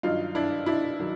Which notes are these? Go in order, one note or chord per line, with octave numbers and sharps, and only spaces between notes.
G2 D#3 F#3 D#4 F4
D4 E4
D4 E4
D#3 F#3